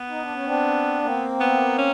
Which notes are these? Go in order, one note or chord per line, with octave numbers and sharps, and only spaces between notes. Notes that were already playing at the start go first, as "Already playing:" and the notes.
Already playing: B3
D#4
D4
C#4
C4 D4
A#3 C4
B3
C#4